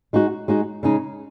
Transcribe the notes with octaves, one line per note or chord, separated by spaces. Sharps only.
G#3 D#4 F#4
G#3 D#4 F#4
C#3 G#3 D#4